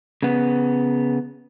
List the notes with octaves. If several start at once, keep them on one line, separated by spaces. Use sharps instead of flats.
C#3 B3